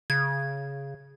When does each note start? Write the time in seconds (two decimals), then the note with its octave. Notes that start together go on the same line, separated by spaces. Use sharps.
0.10 C#3 G#6